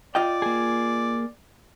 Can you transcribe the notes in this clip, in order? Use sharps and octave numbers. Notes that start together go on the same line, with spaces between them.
F4 D5 D#5 G5
A#3 G#4